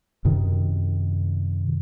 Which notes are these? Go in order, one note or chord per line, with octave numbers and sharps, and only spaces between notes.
F#2 C3 D#3